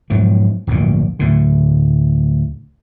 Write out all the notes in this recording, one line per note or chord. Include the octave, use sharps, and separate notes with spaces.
G#2 B2 F3 F#3
D1 A#1 G2 A#2
D2 A2 D3